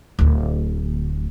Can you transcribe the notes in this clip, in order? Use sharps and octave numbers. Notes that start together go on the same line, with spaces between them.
D1 D2